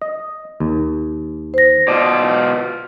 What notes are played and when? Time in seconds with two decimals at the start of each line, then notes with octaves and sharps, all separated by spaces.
0.02 D#5
0.60 D#2
1.54 C5 A#6
1.88 B2 F4 D5